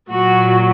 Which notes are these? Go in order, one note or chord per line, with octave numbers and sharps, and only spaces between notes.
A#2 F#3 F#4